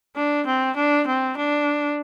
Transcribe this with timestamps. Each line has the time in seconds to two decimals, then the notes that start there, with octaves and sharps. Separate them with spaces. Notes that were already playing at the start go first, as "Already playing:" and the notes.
0.16 D4
0.46 C4
0.76 D4
1.07 C4
1.37 D4